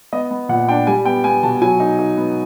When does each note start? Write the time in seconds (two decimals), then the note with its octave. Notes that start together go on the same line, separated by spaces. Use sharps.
0.13 B3 D#5
0.31 B3
0.49 A#2 F#5
0.68 D4 G5
0.87 G3 G#5
1.05 B3 G5
1.24 B3 G#5
1.43 B2 A5
1.61 F#3 G#5
1.80 D#4
1.99 D#4
2.17 B3